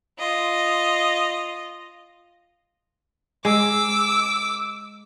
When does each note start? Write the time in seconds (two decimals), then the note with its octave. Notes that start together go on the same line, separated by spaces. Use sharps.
0.19 F4 D#5
3.45 G#3 D6 E6